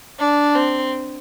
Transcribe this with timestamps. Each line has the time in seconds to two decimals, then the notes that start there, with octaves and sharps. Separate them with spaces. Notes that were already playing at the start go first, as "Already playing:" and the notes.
0.19 D4
0.56 C4